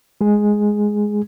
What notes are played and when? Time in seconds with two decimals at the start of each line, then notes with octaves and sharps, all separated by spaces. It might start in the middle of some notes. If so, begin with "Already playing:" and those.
0.21 G#3 G#4